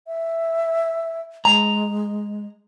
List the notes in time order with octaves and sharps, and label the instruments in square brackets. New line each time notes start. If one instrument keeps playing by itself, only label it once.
[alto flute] E5
[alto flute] G#3 [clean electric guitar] A#5